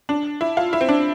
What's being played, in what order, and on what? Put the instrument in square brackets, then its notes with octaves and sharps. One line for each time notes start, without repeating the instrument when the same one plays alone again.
[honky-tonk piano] D4
E4
F4
E4
C4
D4